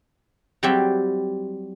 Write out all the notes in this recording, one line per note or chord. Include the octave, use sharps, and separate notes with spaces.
F#3 G3 C4 E4 G4